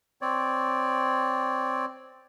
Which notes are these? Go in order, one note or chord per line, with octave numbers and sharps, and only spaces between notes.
C4 C#5 D5